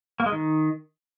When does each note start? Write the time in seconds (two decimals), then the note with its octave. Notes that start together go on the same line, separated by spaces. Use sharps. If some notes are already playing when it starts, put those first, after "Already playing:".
0.20 A#3
0.26 G#3
0.32 D#3